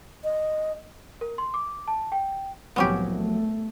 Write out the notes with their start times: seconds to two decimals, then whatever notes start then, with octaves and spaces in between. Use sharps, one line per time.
0.24 D#5
1.21 A#4
1.38 C6
1.54 D6
1.88 A5
2.12 G5
2.76 C2 A2 F3 F#3 B3 C#4 G4 F#5
3.16 A3